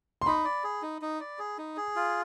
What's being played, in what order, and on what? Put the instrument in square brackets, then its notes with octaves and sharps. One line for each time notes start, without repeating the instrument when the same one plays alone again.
[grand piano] C6
[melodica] D#4 [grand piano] B5
[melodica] D5
G#4
D#4
D#4
D5
G#4
D#4
G#4
F4